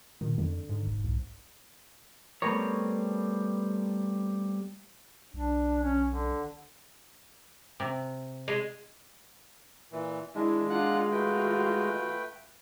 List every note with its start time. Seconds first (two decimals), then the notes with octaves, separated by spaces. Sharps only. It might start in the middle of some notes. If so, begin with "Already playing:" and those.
0.21 A#2 D#3
0.38 F2 D3
0.69 G#2
0.87 F1
1.04 B1
2.42 G3 A3 B3 C4 A#4 C#5
5.34 B1 D4
5.83 C#4
6.07 D3
7.80 C3
8.48 G#3
9.92 A#2 E3
10.35 G#3 D4 E4
10.70 D4 F4 F#5 F#6
11.12 A3 F4 F#4 B4 G5